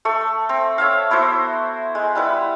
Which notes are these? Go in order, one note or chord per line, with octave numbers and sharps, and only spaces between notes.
A3 A4 C#6
C4
C#5 E5 F5
B3 E4 F#4 C5
G#3
G3 E4 B4 F#5